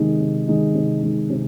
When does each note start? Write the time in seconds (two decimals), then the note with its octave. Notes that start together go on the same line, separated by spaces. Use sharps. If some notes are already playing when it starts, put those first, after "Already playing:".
Already playing: C3 D#3 G#3 D#4
0.19 C3
0.48 D#3 G#3 D#4
0.75 C3
1.02 D#3 G#3 D#4
1.30 C3